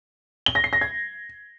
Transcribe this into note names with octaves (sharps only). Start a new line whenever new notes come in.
G7
A#6
C7
A#6
G#6